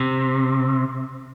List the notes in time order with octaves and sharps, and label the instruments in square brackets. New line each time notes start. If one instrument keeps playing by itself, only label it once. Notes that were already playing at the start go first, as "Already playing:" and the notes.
Already playing: [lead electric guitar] C3